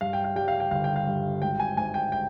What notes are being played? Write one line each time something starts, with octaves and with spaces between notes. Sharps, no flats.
G2 F5
G5
F5
G3 G5
F5
G5
G1 F5
G5
F5
G2
G#1 G5
G#5
G#2 G#5
G5
G5